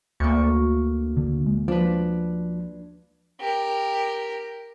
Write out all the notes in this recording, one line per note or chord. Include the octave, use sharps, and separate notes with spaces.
D2 A#3 C#6
D3
G#3
F3 D4 B4
G4 A#4